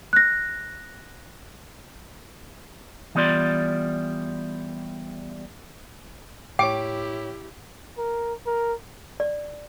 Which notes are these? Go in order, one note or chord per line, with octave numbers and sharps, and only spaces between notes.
F#6 A#6
E3 G3 B3 F4 D5 C6
A2 E4 G4 C#5 G5 D6
A#4
A#4
D5